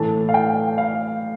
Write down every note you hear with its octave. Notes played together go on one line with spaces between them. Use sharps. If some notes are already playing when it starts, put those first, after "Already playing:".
Already playing: A2 E3 A3 A5
F5
G5
F5